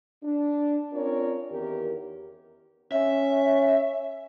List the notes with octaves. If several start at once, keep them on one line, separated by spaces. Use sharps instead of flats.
D4
C4 C#4 F4 A#4 C#5 D5
E2 D#3 G4 A#4
C#4 E5